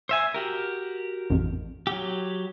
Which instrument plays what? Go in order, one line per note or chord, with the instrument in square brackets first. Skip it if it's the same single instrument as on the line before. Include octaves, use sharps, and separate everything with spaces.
[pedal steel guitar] C5 E5 G#5
F#4 G4 A#4
[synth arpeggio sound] A1 F2
[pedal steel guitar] F#3 G4